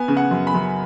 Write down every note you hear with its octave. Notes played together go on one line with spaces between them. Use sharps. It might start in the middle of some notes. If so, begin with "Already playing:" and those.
Already playing: B3 G#5
C#3
F#5
F#2
B5
F#2